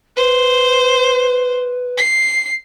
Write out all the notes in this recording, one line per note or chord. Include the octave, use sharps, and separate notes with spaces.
B4 C5
C7